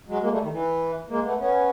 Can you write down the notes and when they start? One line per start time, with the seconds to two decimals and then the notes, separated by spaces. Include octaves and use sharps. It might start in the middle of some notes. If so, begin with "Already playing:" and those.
0.08 F#3 G#3
0.22 G#3 A#3
0.32 G3 A3
0.42 D#3
0.51 E3
1.09 G#3 A#3
1.24 A3 B3
1.38 B3 C#4